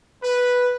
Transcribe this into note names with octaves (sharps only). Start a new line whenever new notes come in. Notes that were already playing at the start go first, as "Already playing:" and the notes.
B4